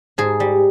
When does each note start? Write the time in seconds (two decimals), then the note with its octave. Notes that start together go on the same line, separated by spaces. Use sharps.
0.18 G#2 G#4
0.40 G3